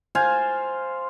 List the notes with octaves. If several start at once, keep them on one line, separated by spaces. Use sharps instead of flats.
F4 C5 F5 G#5